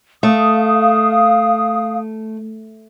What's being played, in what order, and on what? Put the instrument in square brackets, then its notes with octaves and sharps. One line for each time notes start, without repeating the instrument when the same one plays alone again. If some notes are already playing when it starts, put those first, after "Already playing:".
[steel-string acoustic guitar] A3 [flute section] F5 D#6